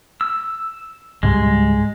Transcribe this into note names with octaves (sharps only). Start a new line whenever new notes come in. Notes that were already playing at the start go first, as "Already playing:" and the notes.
E6
C#2 G#2 G3 G#3